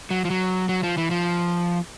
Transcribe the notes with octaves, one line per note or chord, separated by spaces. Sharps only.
F#3
F3
F#3
F#3
F3
E3
F3